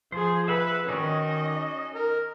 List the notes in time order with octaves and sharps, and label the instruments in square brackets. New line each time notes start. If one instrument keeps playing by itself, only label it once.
[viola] F3 G#4 [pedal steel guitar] C5
[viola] B4 [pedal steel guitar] E5 F#5 B5
[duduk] D#3 [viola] C#4 D#5 [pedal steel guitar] D#4 F#4 D5
[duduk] A#4